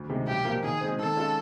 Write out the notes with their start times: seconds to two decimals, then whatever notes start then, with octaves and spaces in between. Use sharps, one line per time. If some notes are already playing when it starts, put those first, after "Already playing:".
Already playing: D2
0.09 C3 D#3 G#3
0.27 B1 G4
0.45 A#2 F3 A#3
0.63 D#3 G#4
0.81 G#3 C4
0.99 D#3 A4
1.17 G#3 C#4 F4